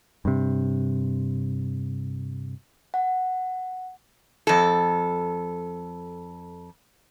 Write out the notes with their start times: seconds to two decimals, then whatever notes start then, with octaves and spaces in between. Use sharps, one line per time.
0.25 G2 C3
2.94 F#5
4.47 F2 A4